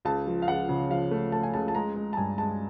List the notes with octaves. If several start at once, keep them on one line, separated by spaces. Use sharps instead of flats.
C#2 A5
F3
F5
C#2 F#5
C#3
F3 F5
A3
A3 A5
G#5
C#2 A5
A5
G#3 A#5
G#3
A5
G2 G#5
G#3 A5